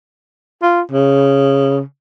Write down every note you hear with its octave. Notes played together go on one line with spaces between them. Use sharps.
F4
C#3